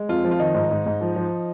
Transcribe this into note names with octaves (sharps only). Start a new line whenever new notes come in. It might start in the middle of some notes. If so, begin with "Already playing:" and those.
Already playing: G#3
F2 F4
F3
F4
D#3 D#4
G#2
G#2
G#2
F3
F3